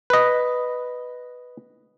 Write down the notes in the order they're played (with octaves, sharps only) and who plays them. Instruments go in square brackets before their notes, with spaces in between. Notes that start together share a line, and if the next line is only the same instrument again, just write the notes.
[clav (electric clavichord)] B4 D#5